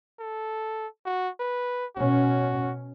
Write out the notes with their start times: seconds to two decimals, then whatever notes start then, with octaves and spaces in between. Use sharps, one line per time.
0.19 A4
1.05 F#4
1.40 B4
1.96 B2 C#4 F#4